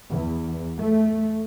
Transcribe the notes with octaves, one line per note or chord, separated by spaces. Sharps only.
E2
A3